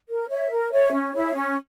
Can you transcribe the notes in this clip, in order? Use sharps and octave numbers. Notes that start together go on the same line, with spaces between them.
A#4
C#5 E5
A#4
C#5 E5
C#4
E4 G#4 C#5
C#4